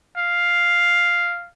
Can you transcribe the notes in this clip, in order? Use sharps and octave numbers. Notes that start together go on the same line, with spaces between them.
F5